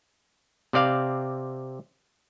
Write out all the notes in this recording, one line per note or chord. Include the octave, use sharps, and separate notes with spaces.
C3 C4 D5 F5